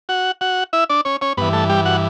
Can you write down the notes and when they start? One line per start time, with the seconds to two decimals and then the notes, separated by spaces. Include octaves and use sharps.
0.09 F#4 F#5
0.41 F#4 F#5
0.73 E4 E5
0.89 D4 D5
1.05 C#4 C#5
1.21 C#4 C#5
1.37 G2 E3 B3 B4
1.53 A3 A4
1.69 G3 G4
1.85 F#4 F#5